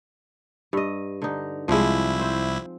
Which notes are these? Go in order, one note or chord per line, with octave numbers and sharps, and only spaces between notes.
G2 D#5
D3 D#4
C2 F3 G#3 E4
C4 C5